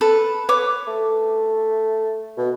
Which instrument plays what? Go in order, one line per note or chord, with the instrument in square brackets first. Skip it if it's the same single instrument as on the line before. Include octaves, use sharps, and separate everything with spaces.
[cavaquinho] A4 B4
[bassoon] B4 [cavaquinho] C#5 D6
[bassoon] A3
B2